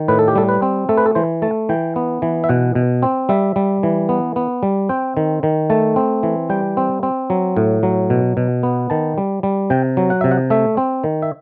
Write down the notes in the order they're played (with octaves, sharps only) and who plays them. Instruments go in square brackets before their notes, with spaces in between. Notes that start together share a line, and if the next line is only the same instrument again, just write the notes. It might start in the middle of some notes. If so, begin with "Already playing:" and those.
Already playing: [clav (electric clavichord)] D#3
A2 B4
A4
G4
G3 A4
B4
C4
A3 A4
B4
A4
E3 C5
A3 A5
E3 G5
B3
E3
E5
B2 F#5
B2
C4
G3 E5
G3
E3
B3
B3
G3
C4 G5
D#3
D#3
A3 A5
C4
E3
G3 G5
C4
C4
F#3
A2
F#3
B2
B2
B3
D#3 A5
G3
G3
C3 G5
F#3
F#5
C3 E5
F#5
A3 E5
C4
D#3
E5